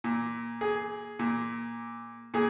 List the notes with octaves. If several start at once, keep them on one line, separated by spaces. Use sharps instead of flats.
A#2
G#4
A#2
A#2 G#4